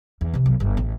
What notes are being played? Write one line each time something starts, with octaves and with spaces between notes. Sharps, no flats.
E2
C3 E3
B1
G1
A1